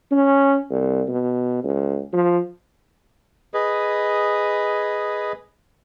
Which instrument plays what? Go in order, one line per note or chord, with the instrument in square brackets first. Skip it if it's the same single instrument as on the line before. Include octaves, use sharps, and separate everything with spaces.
[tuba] C#4
C2
B2
C#2
F3
[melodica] G#4 B4 D#5